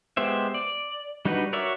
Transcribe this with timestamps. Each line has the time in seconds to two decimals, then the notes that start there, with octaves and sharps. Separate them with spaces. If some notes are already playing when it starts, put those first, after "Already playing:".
0.17 G#3 B3 G4 C5 E5
0.54 D5
1.25 G3 D4 D#4 F#4 B4
1.53 F#4 A#4 C#5 D5 E5